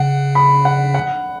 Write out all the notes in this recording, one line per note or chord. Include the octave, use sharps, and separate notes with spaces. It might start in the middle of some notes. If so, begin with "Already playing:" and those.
Already playing: C#3 F#5
B5
F#5
F#5